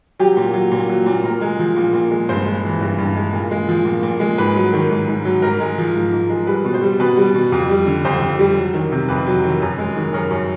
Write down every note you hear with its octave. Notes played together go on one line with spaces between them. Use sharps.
F#3 G4
A#2
F#3
A#2
F#3
A#2
A#2 A#4
G#3
F3
A#2
A#2
G#3
G2 C5
G#3
E3
G2
G2
G#3
A#2
G#3
F3
A#2
A#2
G#3
G#2 B4
F#3
D#3
G#2
G#2
F#3
G#2 A#4
G#3
F3
G#2
G#2
G#3
G3 B4
B2
C5
G3
B2 B4
G3
B2
F2
G3
D3
F2 C5
F2
G3
F#3
D#3
C3
F2 B4
F#3
D#3
F#2
G#3
D#3
F#2 A#4
F#2